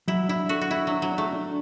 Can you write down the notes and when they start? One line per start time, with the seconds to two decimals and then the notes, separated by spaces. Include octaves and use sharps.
0.08 F#3 E4
0.28 D4 E4
0.49 F#4 A4
0.61 F#4
0.71 D4 E4
0.87 F#3 D4
1.02 F#3
1.12 D4
1.18 A3
1.33 D4